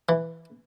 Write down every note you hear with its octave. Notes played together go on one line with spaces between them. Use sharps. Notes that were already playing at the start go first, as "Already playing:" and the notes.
E3